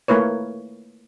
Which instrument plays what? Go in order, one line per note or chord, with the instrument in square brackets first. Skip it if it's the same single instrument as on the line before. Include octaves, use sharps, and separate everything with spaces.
[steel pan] A3 A#3 E4 B4 C#5